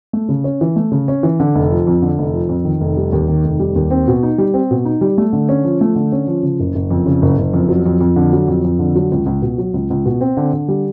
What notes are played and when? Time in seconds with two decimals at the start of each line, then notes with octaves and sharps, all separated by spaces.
0.13 A3
0.29 C#3
0.44 C#4
0.61 E3
0.76 A3
0.92 C#3
1.08 C#4
1.23 E3
1.40 D3
1.55 F1
1.71 F3
1.87 F2
2.02 D3
2.18 F1
2.34 F3
2.49 F2
2.65 D#3
2.81 F1
2.97 G3
3.12 D#2
3.28 D#3
3.44 F1
3.59 G3
3.76 D#2
3.91 C4
4.08 B2
4.23 D#4
4.38 G3
4.54 C4
4.71 B2
4.85 D#4
5.01 G3
5.18 A3
5.33 D3
5.49 C#4
5.64 F3
5.81 A3
5.95 D3
6.12 C#4
6.27 F3
6.43 C#3
6.60 F#1
6.75 F#1
6.90 F2
7.06 C#3
7.22 F#1
7.38 F#1
7.53 F2
7.69 F#3
7.86 F2
8.00 F2
8.16 D3
8.33 F#3
8.48 F2
8.64 F2
8.79 D3
8.95 F#3
9.12 C#2
9.26 C#2
9.42 B2
9.58 F#3
9.74 C#2
9.90 C#2
10.06 B2
10.21 C4
10.37 D3
10.53 D3
10.68 G3